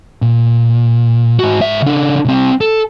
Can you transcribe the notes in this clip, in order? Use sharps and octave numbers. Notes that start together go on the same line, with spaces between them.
A#2
G#2 F#4
G#2 E5
C#3 D4
C2 C4
A4